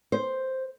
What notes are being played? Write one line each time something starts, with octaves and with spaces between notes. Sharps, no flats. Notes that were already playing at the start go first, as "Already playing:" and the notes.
C5